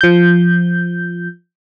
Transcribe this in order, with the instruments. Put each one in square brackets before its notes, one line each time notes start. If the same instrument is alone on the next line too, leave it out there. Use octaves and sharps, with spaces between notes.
[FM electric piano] F3 G6